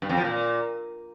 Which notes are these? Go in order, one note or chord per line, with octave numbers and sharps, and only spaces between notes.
G2
F2
F3
A#2